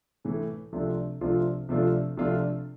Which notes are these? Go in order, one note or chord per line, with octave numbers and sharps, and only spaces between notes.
A2 E3 A3
C3 F3 A3 D4 F4
C3 F3 A3 D4 F4
C3 F3 A3 D4 F4
C3 F3 A3 D4 F4